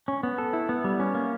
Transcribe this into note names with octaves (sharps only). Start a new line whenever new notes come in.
C#4
B3
A4
E4
B3
G3
C#4
A#3